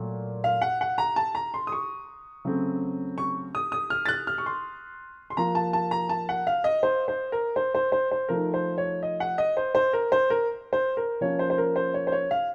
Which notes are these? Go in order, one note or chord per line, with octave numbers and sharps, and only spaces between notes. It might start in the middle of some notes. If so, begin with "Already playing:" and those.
Already playing: A#2 F#3 A3
F5
F#5
F#5
A#5
A5
A#5
C6
D#6
C#6
C#3 F#3 A3 C4
C#6
D#6
D#6
F6
A6
F#6
F6
C#6
C6
C6
F3 A#3 F4 A#5
A5
A5
A#5
A5
F#5
F5
D#5
C5
C5
A#4
C5
C5
C5
C5
F3 A3 D#4 A#4
C5
C#5
D#5
F#5
D#5
C5
C5
A#4
C5
A#4
C5
A#4
F3 A#3 C#4 F4 C#5
C5
C5
A#4
C5
C#5
C5
C#5
F5